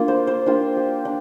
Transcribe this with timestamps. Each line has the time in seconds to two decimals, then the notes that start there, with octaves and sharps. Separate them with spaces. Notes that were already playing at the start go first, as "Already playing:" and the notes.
Already playing: A#3 D4 F4
0.08 C5
0.27 C5
0.46 A#3 D4 F4 G4
0.77 G4
1.05 D4